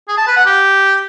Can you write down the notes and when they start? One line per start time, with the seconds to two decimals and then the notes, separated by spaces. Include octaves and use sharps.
0.08 G#4
0.18 A5
0.27 B4
0.36 F#5
0.46 G4